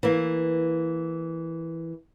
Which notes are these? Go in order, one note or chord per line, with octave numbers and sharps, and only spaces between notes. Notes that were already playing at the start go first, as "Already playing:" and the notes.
E3 A#3